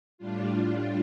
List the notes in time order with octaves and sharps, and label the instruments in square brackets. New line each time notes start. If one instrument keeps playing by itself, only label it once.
[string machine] A2 G3 D4 F4